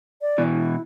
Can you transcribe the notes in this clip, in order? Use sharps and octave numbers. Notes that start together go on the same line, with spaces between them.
D5
B2 E3
E4